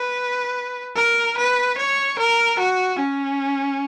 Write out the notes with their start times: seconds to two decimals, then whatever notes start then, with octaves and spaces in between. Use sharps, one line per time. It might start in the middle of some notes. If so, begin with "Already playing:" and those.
Already playing: B4
0.96 A#4
1.38 B4
1.78 C#5
2.18 A#4
2.59 F#4
2.99 C#4